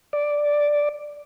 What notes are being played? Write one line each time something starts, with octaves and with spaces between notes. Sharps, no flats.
D5